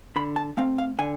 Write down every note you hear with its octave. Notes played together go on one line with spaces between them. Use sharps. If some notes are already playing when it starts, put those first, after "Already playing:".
D3 B5
A5
A3 C4 F5
F5
D3 G#5